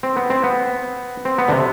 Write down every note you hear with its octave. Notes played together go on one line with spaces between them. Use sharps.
C4
B3
C4
B3
C4
B3
D3
C3